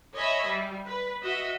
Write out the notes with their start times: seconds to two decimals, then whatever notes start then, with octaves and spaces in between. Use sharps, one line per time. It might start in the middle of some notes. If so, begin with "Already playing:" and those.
0.13 C#5 D#5 E5 G#5 B5
0.45 G3
0.86 B4
1.22 F#4 D#5 E5